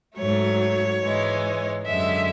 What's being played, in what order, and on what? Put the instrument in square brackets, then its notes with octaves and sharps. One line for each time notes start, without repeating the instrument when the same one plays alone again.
[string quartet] G#2 F#3 A3 C#5
G#2 E3 G#3
F#2 D3 G#3 E5